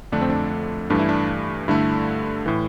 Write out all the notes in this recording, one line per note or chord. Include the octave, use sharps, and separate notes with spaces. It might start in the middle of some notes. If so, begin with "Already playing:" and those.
F2 D3 A3 D4
C4
D4
G2 E3 A3 D4
E4
D4
G2 D3 A3 E4
A2 E3